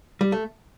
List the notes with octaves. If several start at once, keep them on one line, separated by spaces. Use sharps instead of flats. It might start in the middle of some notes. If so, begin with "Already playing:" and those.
G3
A3